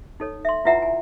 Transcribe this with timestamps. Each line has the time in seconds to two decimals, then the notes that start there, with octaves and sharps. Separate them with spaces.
0.20 D#4 A4 C#5
0.45 E5 C6
0.65 E4 F4 B4 E5 F#5 A#5
0.82 G#5